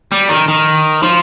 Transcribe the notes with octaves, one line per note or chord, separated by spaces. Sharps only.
G3
D#3
D#3
F3